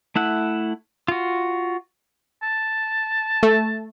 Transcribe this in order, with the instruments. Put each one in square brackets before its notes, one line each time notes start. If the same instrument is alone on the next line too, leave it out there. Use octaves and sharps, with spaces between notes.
[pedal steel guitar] A3 E4 F#5
F4 F#4
[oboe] A5
[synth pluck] A3